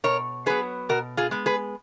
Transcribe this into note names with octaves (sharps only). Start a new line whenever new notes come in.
B2 A#4 C#5
F#3 B3 G#4 B4
B2 F#4 A#4
F4 G#4
G#3 B3
G#4 B4